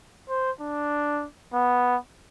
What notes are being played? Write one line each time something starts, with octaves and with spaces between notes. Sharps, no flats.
C5
D4
B3